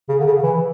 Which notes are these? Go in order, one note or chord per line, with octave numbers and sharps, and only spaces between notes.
C#3
D3
C#3
E3